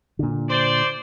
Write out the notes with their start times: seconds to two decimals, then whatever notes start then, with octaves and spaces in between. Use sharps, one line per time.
0.19 A#2 D3
0.50 C5 D5